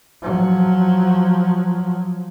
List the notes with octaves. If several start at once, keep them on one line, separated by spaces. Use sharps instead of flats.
F3 F#3